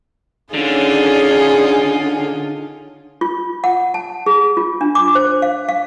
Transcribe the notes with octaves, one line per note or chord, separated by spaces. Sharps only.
D3 C#4 D#4 F4 G#4
F4
F#5
A5
G#4
F4
D4
D6
C5
F5
F5